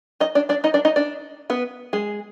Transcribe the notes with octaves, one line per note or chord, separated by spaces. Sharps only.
D#4 D#5
D4 D5
D4 D5
D#4 D#5
D4 D5
D#4 D#5
D4 D5
B3 B4
G#3 G#4